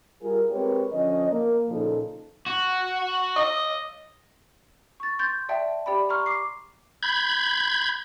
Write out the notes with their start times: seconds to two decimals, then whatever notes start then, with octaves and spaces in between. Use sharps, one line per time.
0.22 G3 F4 G#4 A#4
0.50 G#3 C4 G4 A#4 B4 C#5
0.92 D3 F3 C#4 D#5
1.31 A#3 A#4
1.69 A#2 C#3 F3 D#4 A4
2.46 F#4
3.36 D#5
5.00 C#6 A6
5.19 C6 G6 A6
5.49 D5 E5 G5 A5
5.86 G4 D5 G5 B5
6.09 A#5 C6 C#6 F6
6.26 D6 C7
7.03 B5 G6 G#6